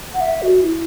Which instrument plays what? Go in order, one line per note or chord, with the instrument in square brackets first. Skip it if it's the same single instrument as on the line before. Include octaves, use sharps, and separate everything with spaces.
[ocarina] F#5
E5
F#4
E4